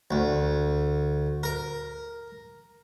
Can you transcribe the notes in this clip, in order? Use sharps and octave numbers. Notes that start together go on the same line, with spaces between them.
D2
A#4